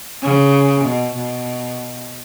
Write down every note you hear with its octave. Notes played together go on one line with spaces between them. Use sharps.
C#3
B2
B2